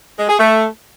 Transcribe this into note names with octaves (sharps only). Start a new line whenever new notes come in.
G#3
G#4
A3